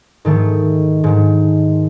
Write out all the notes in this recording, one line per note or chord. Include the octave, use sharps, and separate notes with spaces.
G#2 D#3 A3
G#2 D#3